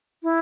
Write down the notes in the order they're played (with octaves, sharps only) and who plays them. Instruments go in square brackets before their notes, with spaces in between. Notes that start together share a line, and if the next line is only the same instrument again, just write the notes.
[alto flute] E4